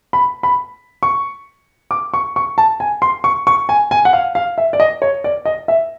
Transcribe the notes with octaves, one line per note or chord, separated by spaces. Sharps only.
B5
B5
C#6
D6
C#6
C#6
A5
G#5
C6
C#6
C#6
G#5
G#5
F#5
F5
F5
E5
D5
D#5
C#5
D5
D#5
E5